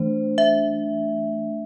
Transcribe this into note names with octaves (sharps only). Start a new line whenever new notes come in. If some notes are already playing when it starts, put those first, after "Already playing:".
Already playing: E3 A3 D4 C5
E5